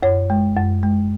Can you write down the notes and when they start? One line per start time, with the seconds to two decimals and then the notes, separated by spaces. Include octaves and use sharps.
0.03 F#2 C#5
0.30 G#3
0.57 F#2
0.83 G#3